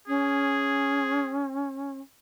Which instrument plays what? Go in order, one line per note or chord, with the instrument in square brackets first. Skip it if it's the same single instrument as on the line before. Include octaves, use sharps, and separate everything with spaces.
[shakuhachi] C#4 [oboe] G#4